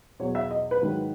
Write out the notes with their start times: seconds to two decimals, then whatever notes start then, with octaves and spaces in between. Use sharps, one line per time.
0.20 E2 B2 F#3 C#5
0.35 E5
0.51 D#5
0.71 B4
0.82 G#2 D#3 F#3